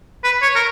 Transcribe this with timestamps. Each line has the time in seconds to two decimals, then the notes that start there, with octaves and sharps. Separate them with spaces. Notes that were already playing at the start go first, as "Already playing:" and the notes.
0.24 B4
0.42 C#5
0.56 A#4